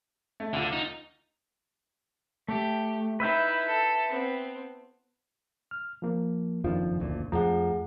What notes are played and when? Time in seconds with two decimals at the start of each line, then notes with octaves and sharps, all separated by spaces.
0.40 A3
0.53 D2 D3 F4
0.73 D#4
2.48 A3 G4
3.20 D#4 E4 B4 E5 G5
3.68 A4
4.08 B3 C4
5.71 F6
6.02 F3 A#3
6.64 F#1 F2 D#3 F3 D4 F4
6.99 F#1 D2 A#2
7.32 F2 F3 A3 G#4 F#5 A#5